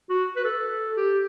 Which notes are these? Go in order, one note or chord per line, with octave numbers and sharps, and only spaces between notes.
F#4
B4
A4
G4